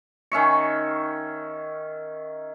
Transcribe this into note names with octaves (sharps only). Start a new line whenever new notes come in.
D#3 C#4 E5 C#6